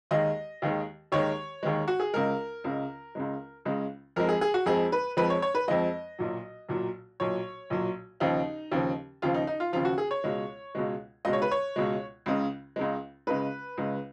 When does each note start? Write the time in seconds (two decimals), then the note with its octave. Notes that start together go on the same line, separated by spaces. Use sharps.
0.11 D#2 D#3 G#3 D#5
0.62 D#2 D#3 G#3
1.12 D#2 D#3 G#3 C#5
1.63 D#2 D#3 G#3
1.88 F#4
2.00 G#4
2.13 C#2 C#3 G#3 A#4
2.64 C#2 C#3 G#3
3.15 C#2 C#3 G#3
3.65 C#2 C#3 G#3
4.16 F2 F3 G#3 A#4
4.29 G#4
4.41 G#4
4.54 F#4
4.66 F2 F3 G#3 G#4
4.92 B4
5.17 F2 F3 G#3 B4
5.30 C#5
5.42 C#5
5.55 B4
5.68 F2 F3 G#3 D#5
6.19 B1 A#2 F#3
6.69 B1 A#2 F#3
7.20 B1 A#2 F#3 C#5
7.70 B1 A#2 F#3
8.20 D#2 C#3 F3 D#4
8.72 D#2 C#3 F3
9.22 D#2 C#3 F3 F4
9.34 D#4
9.47 D#4
9.60 F4
9.73 D#2 C#3 F3 F4
9.85 F#4
9.98 G#4
10.11 C#5
10.24 C#2 B2 G#3
10.75 C#2 B2 G#3
11.25 C#2 B2 G#3 D#5
11.33 C#5
11.42 B4
11.51 C#5
11.76 C#2 B2 G#3
12.26 C#2 C#3 G#3
12.76 C#2 C#3 G#3
13.27 C#2 C#3 G#3 B4
13.77 C#2 C#3 G#3